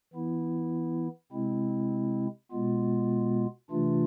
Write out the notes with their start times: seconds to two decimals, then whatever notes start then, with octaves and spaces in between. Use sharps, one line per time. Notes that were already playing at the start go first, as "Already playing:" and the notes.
0.13 E3 B3 E4
1.32 C3 G#3 C4 E4
2.51 B2 G#3 B3 F4
3.70 C3 E3 A3 D4 F4